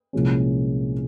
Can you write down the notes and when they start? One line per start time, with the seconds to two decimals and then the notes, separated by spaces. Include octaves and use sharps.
0.13 C2 A#2 F3 G#3 C#4